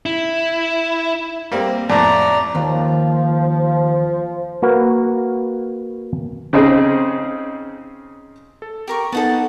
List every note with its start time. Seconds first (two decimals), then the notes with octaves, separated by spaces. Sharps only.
0.06 E4
1.52 G3 A#3 C4
1.90 F2 A2 D5 A#5
2.55 D#2 F3
4.62 A#3 F#4 B4
6.53 C#3 C4 D#4 G#4
8.62 A4
8.88 G4 A#4 C#6
9.12 B3 D#4 A4 F#5 A5